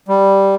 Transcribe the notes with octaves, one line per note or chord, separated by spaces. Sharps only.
G3